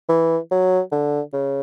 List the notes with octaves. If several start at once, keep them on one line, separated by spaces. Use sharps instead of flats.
E3
F#3
D3
C#3